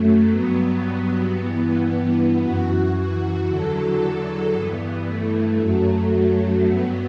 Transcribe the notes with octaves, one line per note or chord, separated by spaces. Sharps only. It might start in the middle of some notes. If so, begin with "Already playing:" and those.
Already playing: F#2 F#3 A3
G2 F#3 B3
G2 E3
F#2 E3 F#4
F#4
E2 D3 F#3 A4
G2 E3 B3
A3
F#2 F#3
G2 F#3 B3